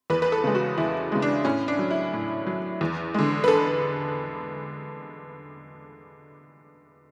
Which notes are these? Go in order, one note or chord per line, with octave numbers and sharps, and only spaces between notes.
E2 B4
B4
A4
C#3 G#3
F#4
E2 E4
C#3 G#3
D4
A2 C#4
D4
F#3
E4
A2
F#3
E2
D3 G#3
B4
A4